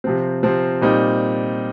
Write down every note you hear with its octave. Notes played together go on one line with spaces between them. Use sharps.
C3 F3 C4
C3 F3 C4
A#2 G3 C4 D#4